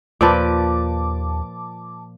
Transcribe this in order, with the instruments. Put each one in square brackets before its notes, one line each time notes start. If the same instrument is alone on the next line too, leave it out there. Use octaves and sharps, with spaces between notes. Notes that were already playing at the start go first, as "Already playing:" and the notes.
[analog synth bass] D#2 [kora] A#2 F3 B4 [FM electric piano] A5 D6